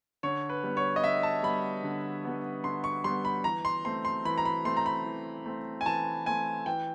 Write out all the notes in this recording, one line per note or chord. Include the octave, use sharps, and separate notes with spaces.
D3 C#5
B4
G3 B3
C#5
D#5
D3 E5
A5
G3 B3 B5
D3
G3 B3
D3 C6
C#6
G3 B3 C6
B5
E3 A#5
C6
A3 C4 C6
C6
E3 B5
A#5
B5
A3 C4 C6
A#5
B5
E3
A3 C4
G#5
E3 A5
A3 C4 G#5
E3 G5